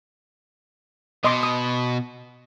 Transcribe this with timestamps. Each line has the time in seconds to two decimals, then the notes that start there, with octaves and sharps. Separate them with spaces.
1.24 B2 D#5 C6 D6
1.43 D#6